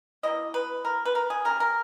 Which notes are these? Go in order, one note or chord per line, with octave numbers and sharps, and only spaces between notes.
B2 A#3 C#4 E4 D#5
B4
A#4
B4
A#4
G#4
C#3 G3 A#3 A#4
A#4